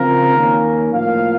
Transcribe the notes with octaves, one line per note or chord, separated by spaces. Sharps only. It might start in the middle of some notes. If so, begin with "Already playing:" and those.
Already playing: C#3 F3 C4 F4 A#4
D#3 A#3 C#4
A2 F3 A#3 F5